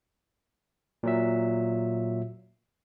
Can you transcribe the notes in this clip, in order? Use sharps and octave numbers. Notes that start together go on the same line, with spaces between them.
A#2 F#3 E5